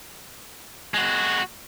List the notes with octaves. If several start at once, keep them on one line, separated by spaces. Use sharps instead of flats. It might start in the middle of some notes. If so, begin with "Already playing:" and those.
G#3 F#4